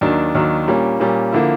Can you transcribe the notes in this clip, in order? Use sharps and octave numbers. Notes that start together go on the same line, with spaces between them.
D#2 D#3 F#3 D4
D#2 D#3 F#3
A#2 G3 A#3 C#4
A#2 G3 A#3 C#4
D3 F3 A#3 E4